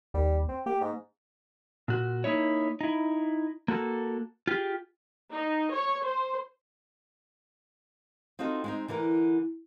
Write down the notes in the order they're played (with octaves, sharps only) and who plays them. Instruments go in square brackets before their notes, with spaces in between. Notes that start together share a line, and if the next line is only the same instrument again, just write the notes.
[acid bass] D#2 [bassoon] G3
[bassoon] C4
[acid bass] A#3 [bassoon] G4
[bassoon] G#2
[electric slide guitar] A#2 F#4
A#3 D#4 E4 C#5
D#4 E4
A#3 F#4 A4
F4 G4 G#4
[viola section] D#4
C#5
C5
[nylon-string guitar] C4 D#4 F4 F#4 A4
G#3 C4 D#4
D3 E3 E4 A#4